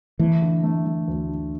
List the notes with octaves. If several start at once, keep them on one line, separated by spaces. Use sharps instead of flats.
E3 A3
D3
A3
A3
D2
D3